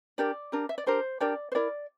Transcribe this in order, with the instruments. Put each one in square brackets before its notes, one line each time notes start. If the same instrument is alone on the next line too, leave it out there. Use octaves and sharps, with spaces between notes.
[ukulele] D4 G4 A#4 D5
D4 G4 A#4
E5
D5
D4 G4 A#4 C5
D4 G4 A#4 D5
C5
E4 A#4 D5